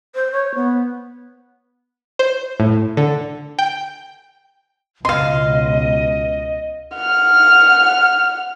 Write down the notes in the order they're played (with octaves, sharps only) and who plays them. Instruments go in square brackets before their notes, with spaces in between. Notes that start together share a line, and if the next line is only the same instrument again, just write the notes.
[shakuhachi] C5
C#5
B3
[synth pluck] C5
A2
D3
G5
[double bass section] C#2 B2 [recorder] D#5 [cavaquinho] F5 C6
[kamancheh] F#5 F6